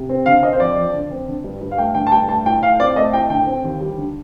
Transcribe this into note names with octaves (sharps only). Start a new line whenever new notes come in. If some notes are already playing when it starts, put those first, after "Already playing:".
Already playing: C3
C4
D3 F5
C4 D#5
C5
F2 D5
F3
D3
C4
D3
G2
G2
F5
A3 G5
D3 G5
A5
G2 G5
A3 A5
A2 G5
A2 F5
C4 D5
A3 D#5
A2 G5
D3 G5
C4
D#2
G3
D3